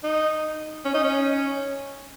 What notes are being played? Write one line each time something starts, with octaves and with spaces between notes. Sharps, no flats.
D#4
C#4
D#4
C#4